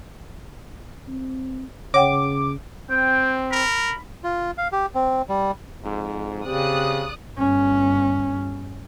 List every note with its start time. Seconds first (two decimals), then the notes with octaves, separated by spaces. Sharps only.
1.08 C4
1.94 C#3 C#5 F#5 G5 D6
2.90 C4 G5
3.51 A#4 B5
4.24 F4
4.58 F5
4.72 G4
4.95 C4
5.29 G3
5.81 F2 G#2
6.45 C#3 C4 G4 D5 D#6 F#6
7.38 G1 C#4